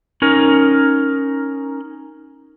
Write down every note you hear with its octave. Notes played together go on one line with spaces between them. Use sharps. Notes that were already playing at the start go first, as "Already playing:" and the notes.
C#4 D#4 A#4